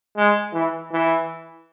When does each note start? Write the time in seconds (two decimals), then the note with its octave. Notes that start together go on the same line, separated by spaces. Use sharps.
0.17 G#3
0.53 E3
0.92 E3